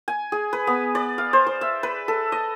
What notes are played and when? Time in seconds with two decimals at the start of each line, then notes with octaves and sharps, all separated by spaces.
0.08 G#5
0.32 G#4
0.53 B4
0.67 B3
0.95 D5
1.18 F5
1.33 C5
1.47 C5
1.61 E5
1.83 B4
2.08 A4
2.32 D#5